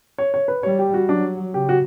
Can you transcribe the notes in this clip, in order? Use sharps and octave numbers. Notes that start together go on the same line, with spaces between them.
C#5
C#5
B4
G3 C#5
G4
F#4
F#3 D4
C#3 G4
F#4